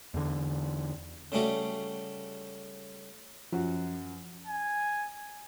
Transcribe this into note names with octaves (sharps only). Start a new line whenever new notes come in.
E2 D3
C#3 G3 A3 F#4
F#2 F3 F#4
G#5